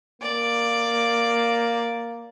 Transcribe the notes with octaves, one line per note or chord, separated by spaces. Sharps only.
A#3 D5